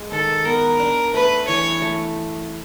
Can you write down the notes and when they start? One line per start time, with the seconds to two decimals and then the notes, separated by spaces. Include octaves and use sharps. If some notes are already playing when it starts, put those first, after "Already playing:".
Already playing: G#3
0.12 D#3 A4
0.45 B3 A#4
0.79 D4
1.14 A3 B4
1.48 E3 C#5
1.82 A3